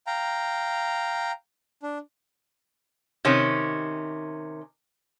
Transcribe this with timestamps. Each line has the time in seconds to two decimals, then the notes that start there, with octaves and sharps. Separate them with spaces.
0.07 F5 G5 A#5
1.83 D4
3.25 C3 D#3 C#4